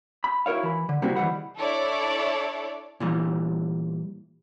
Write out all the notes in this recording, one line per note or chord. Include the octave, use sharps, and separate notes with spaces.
B5
E4 F#4 A#4 C#5 F5
E3 B5
D3
C3 G3 A#3 C4 E4 F#4
D#3 E3 G3 G#4 F#5 B5
D4 E4 A4 C#5 D5
A#2 E3 G3